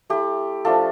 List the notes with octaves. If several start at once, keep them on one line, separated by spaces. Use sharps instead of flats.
A3 E4 G4
F3 A3 D4 F4 A4